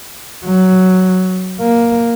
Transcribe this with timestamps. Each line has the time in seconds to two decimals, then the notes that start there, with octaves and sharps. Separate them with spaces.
0.45 F#3
1.59 A#3